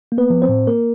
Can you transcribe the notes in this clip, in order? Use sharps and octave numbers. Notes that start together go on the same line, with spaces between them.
A#3
B3 B4
F3
C4 C5
A2
A#3 A#4